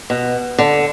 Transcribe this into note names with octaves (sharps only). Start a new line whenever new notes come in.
B2
D3